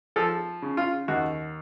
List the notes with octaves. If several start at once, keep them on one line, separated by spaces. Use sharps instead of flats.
F3 A4
C#3
F4
D#2 F#4